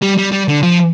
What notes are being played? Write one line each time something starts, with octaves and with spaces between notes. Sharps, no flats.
G3
G3
G3
D3
F3